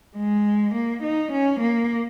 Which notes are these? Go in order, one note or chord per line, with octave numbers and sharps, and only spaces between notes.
G#3
A#3
D#4
C#4
A#3